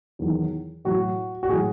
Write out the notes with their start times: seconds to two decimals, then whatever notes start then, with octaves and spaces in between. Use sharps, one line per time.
0.19 E2 D#3 F#3
0.85 A2 F#3 F#4
1.43 F#4
1.49 A2 F#3 G#4